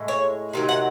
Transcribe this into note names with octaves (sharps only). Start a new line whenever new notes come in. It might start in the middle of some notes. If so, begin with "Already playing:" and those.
Already playing: A2 G#3
C#5
C3 D#3 F#3
F#5